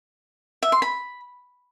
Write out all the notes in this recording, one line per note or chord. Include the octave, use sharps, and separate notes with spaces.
E5
C6
B5